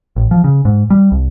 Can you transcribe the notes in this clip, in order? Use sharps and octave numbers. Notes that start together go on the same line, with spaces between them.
A1
F3
C#3
G#2
G3
C2